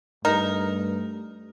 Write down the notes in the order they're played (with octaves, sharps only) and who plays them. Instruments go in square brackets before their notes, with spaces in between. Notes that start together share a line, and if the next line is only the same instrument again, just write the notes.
[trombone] G2 [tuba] A3 [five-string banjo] D#4 [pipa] A#4